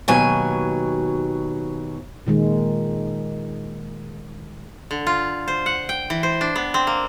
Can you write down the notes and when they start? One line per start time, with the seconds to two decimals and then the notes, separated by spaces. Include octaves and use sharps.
0.08 D#2 B2 F#3 G#5
2.27 A#2 D#3 G#3
4.91 D3
5.07 F4
5.48 C5
5.66 F#5
5.89 G5
6.10 E3
6.23 C5
6.41 D4
6.56 B3
6.74 C4
6.87 A#3